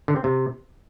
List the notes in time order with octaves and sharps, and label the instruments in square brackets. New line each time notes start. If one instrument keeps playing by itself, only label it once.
[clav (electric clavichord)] D3
C4
C3